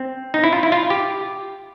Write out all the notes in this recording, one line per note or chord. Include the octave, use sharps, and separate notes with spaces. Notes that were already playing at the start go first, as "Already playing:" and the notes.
Already playing: C4
D#4
E4
F4
E4
F4
G4